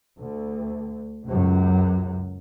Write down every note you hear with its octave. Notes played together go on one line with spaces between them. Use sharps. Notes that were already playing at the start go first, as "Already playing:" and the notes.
D2
C#2 F#2